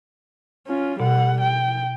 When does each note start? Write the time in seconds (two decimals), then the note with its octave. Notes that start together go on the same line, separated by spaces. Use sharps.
0.67 C#4 F4
1.00 B2 G3 F#5
1.41 G5